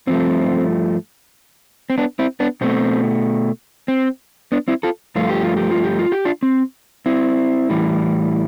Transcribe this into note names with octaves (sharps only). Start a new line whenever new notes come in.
G2 F3 A3 C4
C4
B3 D4
C4 E4
B3 D4
B2 A3 C4
C4
B3 D4
C4 E4
F4 A4
G2 F3 A3 F4
G4
F4
G4
F4
G4
F4
G4
D4 F4
C4
C4 E4
A2 E3 G3